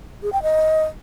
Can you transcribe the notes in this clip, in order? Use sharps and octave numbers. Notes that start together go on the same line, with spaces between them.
G#4
G5
D#5